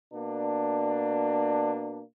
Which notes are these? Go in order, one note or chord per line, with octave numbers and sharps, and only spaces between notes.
B2 A#3 D4